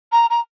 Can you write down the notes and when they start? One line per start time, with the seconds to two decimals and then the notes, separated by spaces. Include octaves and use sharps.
0.12 A#5
0.30 A#5